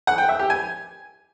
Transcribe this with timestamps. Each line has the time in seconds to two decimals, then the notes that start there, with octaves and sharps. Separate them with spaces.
0.07 F#5
0.18 G5
0.29 E5
0.39 G4
0.50 G#5